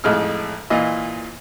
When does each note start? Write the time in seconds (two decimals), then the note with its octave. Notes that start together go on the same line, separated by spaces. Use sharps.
0.04 A1 F2 G#3 D#4 F6
0.70 A#2 E3 F4 D#5